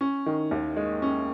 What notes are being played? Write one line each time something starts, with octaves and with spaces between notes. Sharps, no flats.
C#4
D#3
D#2
G#3
C#4